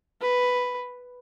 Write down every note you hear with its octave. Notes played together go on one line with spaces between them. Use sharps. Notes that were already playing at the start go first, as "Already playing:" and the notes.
B4